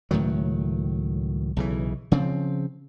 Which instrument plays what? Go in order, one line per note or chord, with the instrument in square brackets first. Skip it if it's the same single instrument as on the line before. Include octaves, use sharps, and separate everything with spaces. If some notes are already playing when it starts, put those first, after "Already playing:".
[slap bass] C#2 A2 D#3 F#3
B1 C#3 E3
C#3 F3 C4